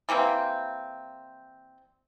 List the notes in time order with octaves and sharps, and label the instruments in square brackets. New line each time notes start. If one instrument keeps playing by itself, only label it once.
[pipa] E3 G3 A#3 C4